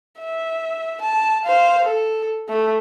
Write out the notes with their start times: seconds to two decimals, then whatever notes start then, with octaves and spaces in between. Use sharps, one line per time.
0.20 E5
1.01 A5
1.45 C5 F5
1.85 A4
2.49 A3